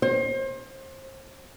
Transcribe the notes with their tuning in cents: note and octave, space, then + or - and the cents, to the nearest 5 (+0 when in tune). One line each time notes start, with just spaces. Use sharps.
C5 +35